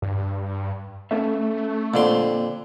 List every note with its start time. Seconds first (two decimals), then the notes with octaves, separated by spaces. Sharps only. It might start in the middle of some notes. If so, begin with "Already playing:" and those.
0.02 G2
1.11 A3 C#4 A4 E5
1.94 F2 A#2 D3 C6